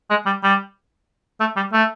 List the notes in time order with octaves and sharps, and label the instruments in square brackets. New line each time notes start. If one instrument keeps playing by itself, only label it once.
[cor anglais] G#3
G3
G3
A3
G3
A3